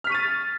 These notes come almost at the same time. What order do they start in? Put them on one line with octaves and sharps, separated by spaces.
F6 B6 C#6 D#7 A6